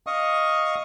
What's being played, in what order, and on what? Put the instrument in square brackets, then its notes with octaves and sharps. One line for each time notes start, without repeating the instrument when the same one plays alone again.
[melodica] D#5 F5 C#6 D#6